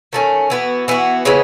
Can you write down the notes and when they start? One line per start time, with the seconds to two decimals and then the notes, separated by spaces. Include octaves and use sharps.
0.13 D#3 A3 C#4
0.50 E3 B3 F#4
0.88 E3 B3 F#4
1.25 C#3 E3 G#3 B3